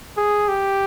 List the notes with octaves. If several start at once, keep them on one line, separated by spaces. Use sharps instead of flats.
G#4
G4